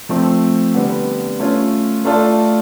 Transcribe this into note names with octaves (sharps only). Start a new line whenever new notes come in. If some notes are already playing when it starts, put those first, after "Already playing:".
F3 A3 C4
D3 G3 B3
A3 C#4 F4
A3 D4 F4 A4